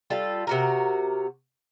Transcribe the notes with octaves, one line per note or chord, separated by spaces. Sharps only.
G3 F4 A4
C3 F#4 A#4